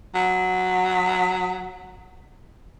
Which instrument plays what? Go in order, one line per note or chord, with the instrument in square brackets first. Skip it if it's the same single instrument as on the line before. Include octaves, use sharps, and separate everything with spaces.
[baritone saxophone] F#3